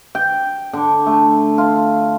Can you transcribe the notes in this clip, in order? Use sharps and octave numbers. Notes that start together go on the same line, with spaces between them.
G5
D3
A3
F4